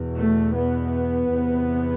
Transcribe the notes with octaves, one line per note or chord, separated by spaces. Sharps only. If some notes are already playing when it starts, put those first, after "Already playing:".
Already playing: E2 B2
A3
B3
E2 C3